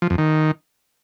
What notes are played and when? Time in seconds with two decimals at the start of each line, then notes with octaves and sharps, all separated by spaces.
0.02 F3
0.10 F2
0.18 D#3